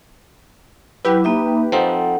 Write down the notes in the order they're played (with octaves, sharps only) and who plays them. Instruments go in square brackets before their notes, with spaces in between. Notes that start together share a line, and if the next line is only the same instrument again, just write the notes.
[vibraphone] F#3 E4 [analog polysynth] G4 B4
[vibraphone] A#3 D#4 E5
[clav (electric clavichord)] F3 C4 D#4 [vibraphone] A4 F#5